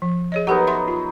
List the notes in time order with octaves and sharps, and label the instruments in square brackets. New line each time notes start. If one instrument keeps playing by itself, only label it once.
[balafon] F3
G#4 C#5 D#5
[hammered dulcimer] F#3 B3 D#4 [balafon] G4 A4 A#4
[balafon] E5 C6
F4